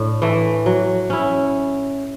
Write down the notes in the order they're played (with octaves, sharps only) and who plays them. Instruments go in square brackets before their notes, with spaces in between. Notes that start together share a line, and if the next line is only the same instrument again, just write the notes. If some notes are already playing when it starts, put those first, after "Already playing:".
Already playing: [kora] A2 [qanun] D4
[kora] E3 A3
F#3
C#4 E4